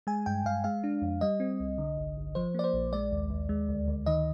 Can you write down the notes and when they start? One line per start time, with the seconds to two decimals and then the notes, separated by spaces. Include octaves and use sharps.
0.07 G#3 G#5
0.26 G2 G5
0.45 G2 F5
0.64 G#3 F5
0.84 D4
1.02 F2
1.21 G3 D#5
1.40 C4
1.60 C2
1.78 D3
1.97 G1
2.17 G1
2.35 F3 C5
2.54 A#3 D5
2.64 C5
2.74 A#1
2.93 G#3 D5
3.12 D#2
3.30 D#2
3.49 G#3
3.69 D2
3.88 D2
4.06 D#3 D#5